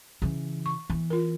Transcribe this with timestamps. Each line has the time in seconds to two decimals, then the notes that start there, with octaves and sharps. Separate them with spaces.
0.22 C#3 E3
0.66 C#6
0.90 E3 B3
1.10 F4 A#4